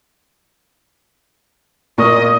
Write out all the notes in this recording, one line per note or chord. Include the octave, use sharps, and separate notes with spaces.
A#2 A#4 D#5 C#6